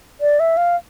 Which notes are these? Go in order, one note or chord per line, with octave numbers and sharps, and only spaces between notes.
D5
E5
F5